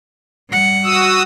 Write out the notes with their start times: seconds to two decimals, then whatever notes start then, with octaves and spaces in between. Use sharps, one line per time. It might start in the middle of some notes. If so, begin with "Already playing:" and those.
0.49 G3 F#5
0.84 F#4 D#6 E6